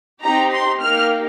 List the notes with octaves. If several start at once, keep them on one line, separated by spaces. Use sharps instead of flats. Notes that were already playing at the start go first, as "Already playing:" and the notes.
C4 D#4 G4 A#5
C6
A#3 D#4 G4 F6